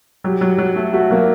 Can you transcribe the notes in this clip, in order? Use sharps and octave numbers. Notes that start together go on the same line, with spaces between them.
F#3 G4
F#3
F#3
A3
A3 F#4
F#3 A#3